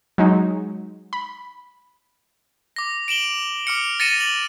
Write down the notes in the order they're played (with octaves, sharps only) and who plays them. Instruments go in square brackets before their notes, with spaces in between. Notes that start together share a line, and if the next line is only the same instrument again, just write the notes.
[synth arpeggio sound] F#3 G#3 D#4
B5
[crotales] D6 A#6
D7 E7 F#7 G7
D6 F6 C#7
A6 A#6 C#7 D#7 E7
F#7